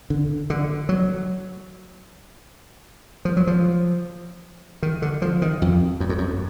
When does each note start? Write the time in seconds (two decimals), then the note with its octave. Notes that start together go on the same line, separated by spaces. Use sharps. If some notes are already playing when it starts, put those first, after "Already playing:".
0.10 D3
0.50 D3
0.89 F#3
3.25 F3
3.37 F#3
3.47 F3
4.83 D#3
5.02 D3
5.22 F3
5.42 D#3
5.62 F2
6.00 F#2
6.09 F2
6.18 F#2